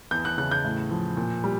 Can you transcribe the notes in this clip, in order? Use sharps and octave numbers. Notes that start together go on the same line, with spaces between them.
E2 G6
F#6
C#3 F#6
G6
A2
F3
A#2
G3